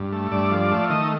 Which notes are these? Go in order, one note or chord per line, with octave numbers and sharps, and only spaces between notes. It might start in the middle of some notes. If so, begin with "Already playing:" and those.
Already playing: G2
A3
G2 D5
F3
A3
D#3 D#5